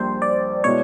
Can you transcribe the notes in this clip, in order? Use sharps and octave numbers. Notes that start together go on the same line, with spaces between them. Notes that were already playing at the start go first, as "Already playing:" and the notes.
Already playing: A#1 A#2 G3 C5
D5
B2 G#3 B3 E4 C#5